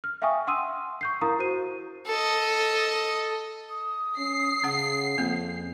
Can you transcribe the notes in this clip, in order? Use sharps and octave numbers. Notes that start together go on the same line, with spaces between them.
F6
E5 F5 G5 G#5 C#6 D#6
F#5 C6 D#6 E6 D#7
C#6 G6 C7
E4 A#4 F5 A#5 D#6
F#4 C5 D#7
A4 D#5
D#6
C#4 C7
C#3 C#4 F#5
F2 A#3 C4